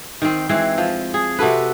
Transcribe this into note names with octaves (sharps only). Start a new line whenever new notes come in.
D#3 C4
E3 G#3 C4
F3
G#4
C3 F#4 A4 B4